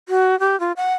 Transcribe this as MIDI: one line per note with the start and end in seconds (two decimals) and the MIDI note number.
0.09 0.38 66
0.40 0.58 67
0.60 0.72 65
0.77 0.93 78